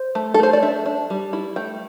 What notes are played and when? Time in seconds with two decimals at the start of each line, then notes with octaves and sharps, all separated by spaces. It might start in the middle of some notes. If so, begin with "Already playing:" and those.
Already playing: C5
0.15 A3
0.34 A4
0.40 A3 C5
0.53 D5
0.63 D4 E5
0.86 D4
1.10 G3
1.33 E4
1.56 A3 G5